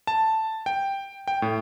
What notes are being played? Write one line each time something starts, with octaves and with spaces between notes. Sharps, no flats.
A5
G5
G5
A2